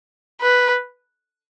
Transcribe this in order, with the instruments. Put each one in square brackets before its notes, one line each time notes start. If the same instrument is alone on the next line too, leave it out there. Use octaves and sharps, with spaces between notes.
[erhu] B4